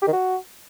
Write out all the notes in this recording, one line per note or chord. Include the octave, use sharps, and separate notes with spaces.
G4
D#3
F#4